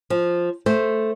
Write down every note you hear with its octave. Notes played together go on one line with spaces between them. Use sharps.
F3
A3 C5